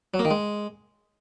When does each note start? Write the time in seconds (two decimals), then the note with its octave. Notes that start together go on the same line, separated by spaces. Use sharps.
0.14 F#3
0.19 A#3
0.25 D#3
0.31 G#3